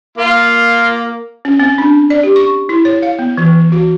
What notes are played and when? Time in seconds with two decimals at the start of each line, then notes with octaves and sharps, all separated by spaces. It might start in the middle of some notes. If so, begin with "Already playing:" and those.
0.18 A#3 F4
1.45 C#4
1.59 C4
1.78 D4
2.10 D5
2.23 G4
2.36 C#6
2.69 E4
2.85 C#5
3.02 F5
3.19 B3
3.37 E3
3.72 F#4